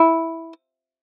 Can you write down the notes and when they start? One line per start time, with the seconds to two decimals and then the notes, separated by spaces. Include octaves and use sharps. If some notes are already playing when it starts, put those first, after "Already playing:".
Already playing: E4